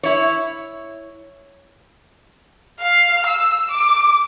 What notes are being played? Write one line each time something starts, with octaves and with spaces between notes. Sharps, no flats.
E4 C#5
F5
E6
D6